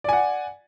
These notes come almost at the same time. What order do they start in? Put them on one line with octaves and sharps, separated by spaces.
D5 G#5 F#5